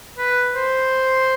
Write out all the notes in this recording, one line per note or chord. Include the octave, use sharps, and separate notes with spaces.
B4
C5